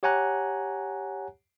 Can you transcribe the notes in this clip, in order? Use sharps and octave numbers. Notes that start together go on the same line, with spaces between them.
G4 C#5 F#5 G#5 A#5 F#6